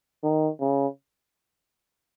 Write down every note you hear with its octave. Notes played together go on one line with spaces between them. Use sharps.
D#3
C#3